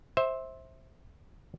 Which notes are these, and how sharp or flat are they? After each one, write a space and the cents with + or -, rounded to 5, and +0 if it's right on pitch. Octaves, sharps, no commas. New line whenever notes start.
C5 +15 E5 -15